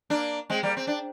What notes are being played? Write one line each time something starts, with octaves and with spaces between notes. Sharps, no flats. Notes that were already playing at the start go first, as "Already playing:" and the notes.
A#3 D4
G#3 C4
G3 A#3
C4
D4